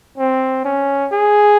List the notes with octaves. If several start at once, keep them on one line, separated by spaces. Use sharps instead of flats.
C4
C#4
G#4